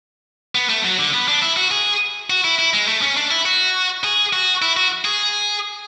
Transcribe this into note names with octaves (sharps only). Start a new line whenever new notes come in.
B3
A3
F#3
D3
B3
D4
E4
F#4
G#4
F#4
E4
E4
G#3
A3
C#4
D4
E4
F#4
G#4
F#4
E4
F#4
G#4